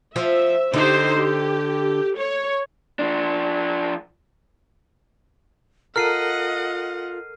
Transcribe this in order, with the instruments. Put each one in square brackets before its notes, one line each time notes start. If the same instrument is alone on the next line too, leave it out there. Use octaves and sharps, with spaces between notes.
[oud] F3 [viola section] E5
[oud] D3 [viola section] D#4 G4 C5
[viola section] G4
C#5
[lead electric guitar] F3 D4
[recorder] F4 [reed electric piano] A4 A#4 [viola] D#5 F#5 [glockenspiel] F6 C7 D#7